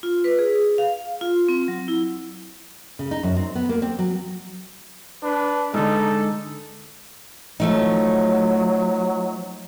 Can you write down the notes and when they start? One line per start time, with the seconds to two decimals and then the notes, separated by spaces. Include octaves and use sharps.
0.03 F4
0.24 B4
0.39 G#4
0.78 F5
0.94 F5
1.21 F4
1.49 C4
1.68 F#3
1.88 E4
2.99 C#3
3.11 D#4
3.23 F#2
3.36 C4
3.55 B3
3.69 A#3
3.82 C4
3.99 F#3
5.23 D4 B4
5.74 G#2 D3 D#4 A4
7.60 F3 F#3 A3 D#4